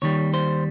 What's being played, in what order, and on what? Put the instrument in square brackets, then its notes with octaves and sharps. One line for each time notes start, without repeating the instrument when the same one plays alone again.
[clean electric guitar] D#2 D#3 G3 C#5
C5